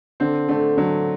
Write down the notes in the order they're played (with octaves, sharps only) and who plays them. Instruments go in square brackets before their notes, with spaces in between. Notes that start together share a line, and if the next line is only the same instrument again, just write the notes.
[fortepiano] D3 [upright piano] C4
[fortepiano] D3 [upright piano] A3
[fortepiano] D3 [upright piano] F#3